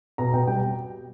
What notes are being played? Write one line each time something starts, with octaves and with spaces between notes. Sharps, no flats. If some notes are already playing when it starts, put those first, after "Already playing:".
B2 A#5
B2 G5
G3 G5